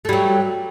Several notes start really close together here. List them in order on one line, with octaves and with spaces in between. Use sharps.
A3 G3 F#3